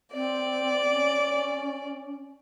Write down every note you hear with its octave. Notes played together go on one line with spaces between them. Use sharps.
C4 D5
C#4